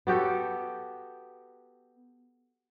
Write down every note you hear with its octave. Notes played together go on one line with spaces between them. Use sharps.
B3 F#4 G4 A4